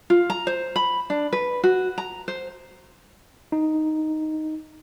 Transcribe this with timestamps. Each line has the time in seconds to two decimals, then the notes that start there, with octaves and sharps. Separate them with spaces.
0.10 F4
0.30 A#5
0.47 C5
0.76 B5
1.10 D4
1.33 B4
1.63 F#4
1.98 A#5
2.28 C5
3.52 D#4